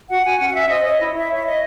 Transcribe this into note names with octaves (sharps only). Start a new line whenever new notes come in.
F#4 F#5
F#4 G#5
C#4 F#5
F#5
C#4 E5
C5 D#5
C#5 D#5
E4
E4 E5
C#5
E5
C#5 D#5